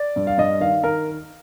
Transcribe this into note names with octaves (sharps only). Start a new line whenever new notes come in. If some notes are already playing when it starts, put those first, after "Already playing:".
Already playing: D5
G2
F5
G2 D#5
D#3 F5
D#3 A#4